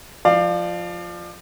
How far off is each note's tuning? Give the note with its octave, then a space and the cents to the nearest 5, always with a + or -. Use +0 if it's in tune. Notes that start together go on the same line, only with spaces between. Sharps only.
F3 +0 D5 +35 F5 +0